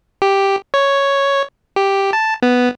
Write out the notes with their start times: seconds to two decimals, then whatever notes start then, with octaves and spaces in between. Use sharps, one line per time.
0.22 G4
0.74 C#5
1.76 G4
2.13 A5
2.42 B3